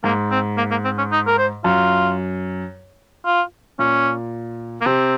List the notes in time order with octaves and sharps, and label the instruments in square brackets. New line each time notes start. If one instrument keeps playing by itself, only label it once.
[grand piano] G#2 [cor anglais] A#3
[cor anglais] C4
A#3
A#3
C4
C#4
D#4
A#4
C5
[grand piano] F#2 [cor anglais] F4
[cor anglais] F4
[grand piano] A#2 [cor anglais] C#4
[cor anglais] A#3
[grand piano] C3 [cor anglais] C4